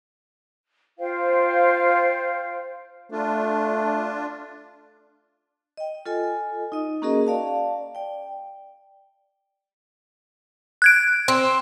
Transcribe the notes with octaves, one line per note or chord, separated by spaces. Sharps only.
F4 C5 F5 G5
A3 D4 F4
D#5 G5
F4 A4 D#5 G#5
D#4 D#5 D#6
A#3 C#4 F#4 G#4 A#4 D#5
D5 F5 A5
D5 G5
F#6 G#6 D7
C4